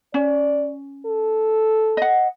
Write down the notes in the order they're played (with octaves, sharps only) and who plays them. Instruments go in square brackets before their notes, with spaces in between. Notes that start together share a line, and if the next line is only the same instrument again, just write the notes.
[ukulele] C#4 [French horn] D5
[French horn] A4
[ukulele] D#5 F#5